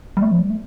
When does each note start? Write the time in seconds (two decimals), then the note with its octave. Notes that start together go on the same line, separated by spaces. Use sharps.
0.17 G3
0.22 A3
0.31 F3
0.41 G3
0.50 A3